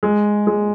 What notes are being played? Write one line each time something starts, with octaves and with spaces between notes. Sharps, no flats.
G#3
G#3